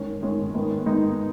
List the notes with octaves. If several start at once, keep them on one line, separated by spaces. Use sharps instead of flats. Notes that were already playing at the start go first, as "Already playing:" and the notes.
Already playing: D#3 G#3 C#4
D#3 G#3 C#4
D#3 G#3 B3 D#4
D#3 G#3 B3 D#4